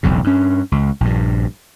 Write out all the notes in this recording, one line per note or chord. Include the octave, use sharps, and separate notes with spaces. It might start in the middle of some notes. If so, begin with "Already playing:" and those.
E1 B1 F2 C#3
G2 C#4
C#2
A#1 G2